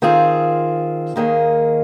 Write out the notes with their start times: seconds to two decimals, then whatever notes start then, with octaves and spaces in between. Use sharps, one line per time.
0.02 D#3 C4 F4 G#4
1.16 D#2 D#3 A#3 G#4